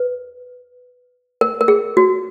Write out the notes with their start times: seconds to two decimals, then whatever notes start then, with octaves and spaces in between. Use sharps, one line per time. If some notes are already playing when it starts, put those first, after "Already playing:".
Already playing: B4
1.41 A#4
1.61 A#4
1.68 G#4
1.97 F#4